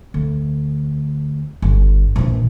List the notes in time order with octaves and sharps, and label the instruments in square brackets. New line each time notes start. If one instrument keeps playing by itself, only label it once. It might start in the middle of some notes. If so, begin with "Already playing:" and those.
[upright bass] D2
G1
A#1 E3